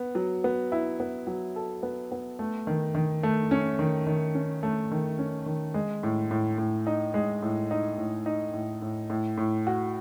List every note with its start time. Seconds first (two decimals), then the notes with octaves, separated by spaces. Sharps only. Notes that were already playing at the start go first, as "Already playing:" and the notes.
Already playing: B3
0.15 F#3
0.44 B3
0.72 E4
1.00 B3
1.27 F#3
1.56 A4
1.83 B3
2.12 B3
2.39 A3
2.67 D#3
2.95 D#3
3.23 A3
3.51 C#4
3.79 D#3
4.07 D#3
4.35 C#4
4.63 A3
4.91 D#3
5.18 C#4
5.46 D#3
5.74 G#3
6.03 A2
6.31 A2
6.58 A2
6.87 D#4
7.14 G#3
7.43 A2
7.71 D#4
7.98 A2
8.26 D#4
8.54 A2
8.82 A2
9.10 A2
9.38 A2
9.67 F#4